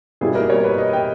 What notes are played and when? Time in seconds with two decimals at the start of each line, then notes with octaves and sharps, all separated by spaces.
0.21 B2 G3 A#3 E4 G#4
0.35 A#4
0.50 C#5
0.64 B4
0.78 D#5
0.93 G5